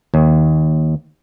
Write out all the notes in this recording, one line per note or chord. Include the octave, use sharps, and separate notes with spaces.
D#2